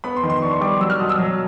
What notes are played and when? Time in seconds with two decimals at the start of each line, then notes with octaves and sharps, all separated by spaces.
0.04 B3 B5
0.17 C6
0.23 D#3
0.30 C6
0.42 D4 C#6
0.53 C#6
0.61 G3 D6
0.80 F#3 E6
0.90 F6
0.99 B2 D#6
1.09 E6
1.19 F#3